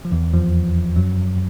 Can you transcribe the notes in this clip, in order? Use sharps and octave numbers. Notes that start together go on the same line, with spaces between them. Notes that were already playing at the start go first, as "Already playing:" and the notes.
F3
E2 E3
F2 F3
F#2 F#3